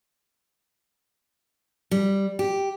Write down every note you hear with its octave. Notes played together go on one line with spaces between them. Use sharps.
G3
G4